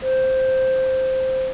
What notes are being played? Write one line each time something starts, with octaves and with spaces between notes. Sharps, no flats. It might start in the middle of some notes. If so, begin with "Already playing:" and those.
C5